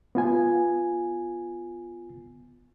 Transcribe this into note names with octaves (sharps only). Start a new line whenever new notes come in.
B3 F4 G#5